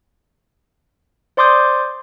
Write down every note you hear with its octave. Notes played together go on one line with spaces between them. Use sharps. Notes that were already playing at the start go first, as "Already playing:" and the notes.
C5 D5 C6 D6 D#6 G6